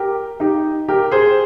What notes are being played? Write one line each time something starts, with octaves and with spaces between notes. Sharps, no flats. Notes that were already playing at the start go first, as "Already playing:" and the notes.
Already playing: G4 A#4
D#4 G4
G4 A#4
G#4 C5